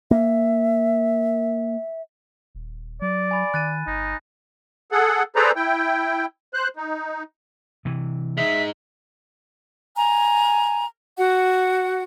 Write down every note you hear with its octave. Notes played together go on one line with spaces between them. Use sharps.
A#3 E5
D#1
F#3 D5
G#5 B5 A6
D#3 F#6 A6 D#7
G1 D#4
G#4 A4 F#5
G#4 A4 B4 C5 D5 A#5
E4 G5
C5 F#6
D#4
C3 E3
G#3 D#4 E5 B6
G#5 A#5
F#4 F#5